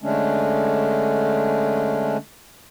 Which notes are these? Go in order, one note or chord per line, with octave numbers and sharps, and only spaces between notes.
D3 G#3 A3 C#4 D4